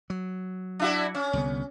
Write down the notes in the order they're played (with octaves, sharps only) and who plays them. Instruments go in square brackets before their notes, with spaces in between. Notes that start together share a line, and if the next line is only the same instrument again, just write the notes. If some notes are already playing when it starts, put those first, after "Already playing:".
[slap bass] F#3
[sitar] D4 E4 F#4
C#4
[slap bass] C2 D3 B3